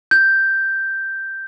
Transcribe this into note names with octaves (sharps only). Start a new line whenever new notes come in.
G6